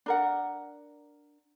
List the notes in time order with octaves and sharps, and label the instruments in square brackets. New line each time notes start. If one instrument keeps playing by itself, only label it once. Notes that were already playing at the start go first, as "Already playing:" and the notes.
[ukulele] D4 A#4 F#5